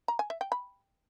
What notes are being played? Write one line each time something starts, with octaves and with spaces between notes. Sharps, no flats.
A#5
G#5
E5
G5
B5